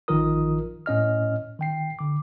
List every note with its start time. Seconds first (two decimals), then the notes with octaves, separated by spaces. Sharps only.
0.08 A1 D#3 F3 F4 A#4 D#6
0.86 A2 C#4 D#5 F6
1.59 D#3 G5 C7
1.99 D3 D6